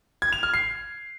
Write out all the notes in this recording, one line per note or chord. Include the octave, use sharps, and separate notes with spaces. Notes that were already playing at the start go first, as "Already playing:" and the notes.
G#6
F7
F6
C7